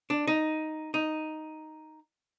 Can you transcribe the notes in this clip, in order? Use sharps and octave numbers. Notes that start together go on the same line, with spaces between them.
D4
D#4
D#4